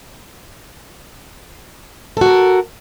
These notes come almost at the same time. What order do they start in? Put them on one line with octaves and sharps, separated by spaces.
A4 F#4 A#4